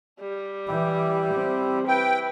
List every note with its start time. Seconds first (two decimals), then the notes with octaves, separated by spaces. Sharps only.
0.20 G3
0.68 E3 E4 G4
1.34 C4
1.88 E4 B4 G5